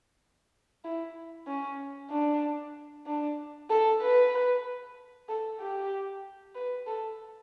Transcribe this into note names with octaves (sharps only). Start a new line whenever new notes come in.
E4
C#4
D4
D4
A4
B4
A4
G4
B4
A4